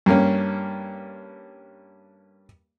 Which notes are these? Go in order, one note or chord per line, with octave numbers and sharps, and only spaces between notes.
G2 A#3 C#4